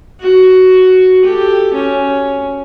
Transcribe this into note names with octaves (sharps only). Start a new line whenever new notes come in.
F#4
G4 A4
C#4